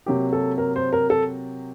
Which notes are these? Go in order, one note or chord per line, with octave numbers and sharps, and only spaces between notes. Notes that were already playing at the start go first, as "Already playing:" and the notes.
C3 F#3 A#3 G4
A4
A#4
C5
A#4
A4